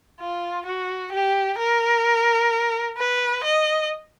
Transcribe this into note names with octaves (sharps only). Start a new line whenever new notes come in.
F4
F#4
G4
A#4
B4
D#5